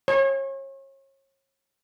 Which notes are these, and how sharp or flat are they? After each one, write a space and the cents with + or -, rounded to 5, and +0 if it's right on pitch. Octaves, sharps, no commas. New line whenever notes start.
C#5 -35